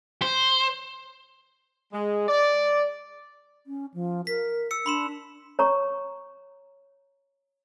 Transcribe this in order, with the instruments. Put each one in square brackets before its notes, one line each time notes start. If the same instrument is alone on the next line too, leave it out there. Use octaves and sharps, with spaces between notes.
[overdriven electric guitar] C5
[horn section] G#3
D5
[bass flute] C#4
F3
[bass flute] A#4 [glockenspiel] B6
[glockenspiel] E6 C#7
[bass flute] D4 [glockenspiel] B5 C6 E7
[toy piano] C#5 A#5 C#6